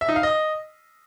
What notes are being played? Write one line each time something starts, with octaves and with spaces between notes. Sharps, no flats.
E5
D#4
F5
D#5